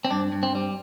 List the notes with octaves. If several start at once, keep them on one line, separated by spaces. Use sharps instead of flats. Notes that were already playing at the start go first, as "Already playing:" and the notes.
C4
G2 D4
G2
C4
G3